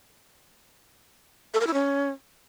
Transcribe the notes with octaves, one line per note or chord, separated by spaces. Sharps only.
A4
A#4
E4
C#4